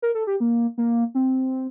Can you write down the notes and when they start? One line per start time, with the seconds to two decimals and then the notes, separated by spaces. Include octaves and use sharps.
0.02 A#4
0.15 A4
0.27 G4
0.40 A#3
0.78 A#3
1.15 C4